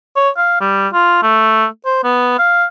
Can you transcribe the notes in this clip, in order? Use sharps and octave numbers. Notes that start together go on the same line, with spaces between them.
C#5
F5
G3
F4
A3
C5
B3
F5